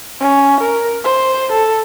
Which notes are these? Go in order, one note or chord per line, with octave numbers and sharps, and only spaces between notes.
C#4
A#4
C5
A4